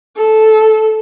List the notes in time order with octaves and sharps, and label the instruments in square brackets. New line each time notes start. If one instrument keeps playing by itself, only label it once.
[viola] A4